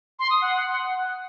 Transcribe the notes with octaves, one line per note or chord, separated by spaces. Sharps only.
C6
D#6
F#5